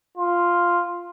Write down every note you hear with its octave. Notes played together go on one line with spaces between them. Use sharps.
F4